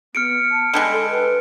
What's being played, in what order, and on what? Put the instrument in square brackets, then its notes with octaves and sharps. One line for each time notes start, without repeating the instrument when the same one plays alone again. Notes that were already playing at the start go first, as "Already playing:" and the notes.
[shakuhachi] B3 [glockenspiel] F6 C#7 D7
[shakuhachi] A5
[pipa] D3 G3 G#3 [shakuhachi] A5
[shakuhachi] A4
B4